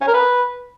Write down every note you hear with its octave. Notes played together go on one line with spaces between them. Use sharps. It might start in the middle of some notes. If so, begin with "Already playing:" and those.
C#4
A#4
B4